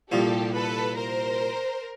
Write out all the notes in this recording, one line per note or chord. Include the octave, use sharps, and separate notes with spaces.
C2 A#2 F3 G4 A4
A4 B4
A#4 C5